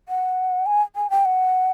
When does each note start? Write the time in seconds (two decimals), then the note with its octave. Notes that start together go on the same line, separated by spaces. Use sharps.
0.09 F#5
0.66 G#5
0.96 G#5
1.10 G5
1.25 F#5